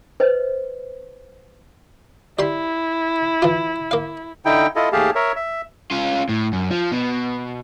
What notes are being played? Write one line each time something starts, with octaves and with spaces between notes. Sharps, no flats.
B4 C5 D#5
G3 E4 B5 C6
E3 F4
A#3 F5
D3 D#4 E4 G5
E4 F4 A4 D#5
D#2 A3 G4 G#4 F5 A5
A#4 C#5 E5
E5
C#4 F4
A2
F#2
F3
B2